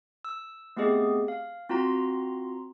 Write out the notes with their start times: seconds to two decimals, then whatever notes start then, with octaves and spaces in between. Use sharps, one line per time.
0.25 E6
0.77 A3 B3 C4 G4 G#4 D#5
1.28 F5
1.69 C4 F4 F#4 A#5 C6